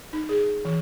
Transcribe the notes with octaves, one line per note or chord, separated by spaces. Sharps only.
D#4
G#4
E3